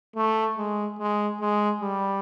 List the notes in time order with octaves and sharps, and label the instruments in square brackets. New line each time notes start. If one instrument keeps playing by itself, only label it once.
[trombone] A3
G#3
G#3
G#3
G3